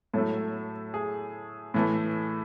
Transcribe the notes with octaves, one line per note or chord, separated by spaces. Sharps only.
A2 F#3 A3 A4
G#4
A2 E3 A3